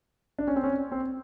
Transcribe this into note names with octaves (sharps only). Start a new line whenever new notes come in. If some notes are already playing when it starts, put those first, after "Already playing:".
D4
C#4
C4
C#4
C4